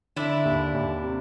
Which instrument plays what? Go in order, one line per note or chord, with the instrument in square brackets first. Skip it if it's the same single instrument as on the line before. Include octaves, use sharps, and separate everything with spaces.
[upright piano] D3 [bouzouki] D4 E4
[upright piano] D#2
D#2
C3